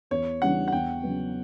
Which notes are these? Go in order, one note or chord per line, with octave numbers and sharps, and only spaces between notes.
E2 C#5
C#3 E3 G3 D4 F#5
F#5
E2 G5
C#3 F#3 B3